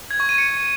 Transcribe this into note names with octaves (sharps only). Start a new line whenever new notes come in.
G#6
C#6
D#7
C#7